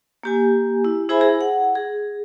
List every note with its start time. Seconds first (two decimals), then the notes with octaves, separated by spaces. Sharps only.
0.23 A#3 G4 G#5
0.85 E4
1.09 E4 G#4 C5 E5 G#5 B5
1.21 G#4
1.41 F#5
1.75 G#4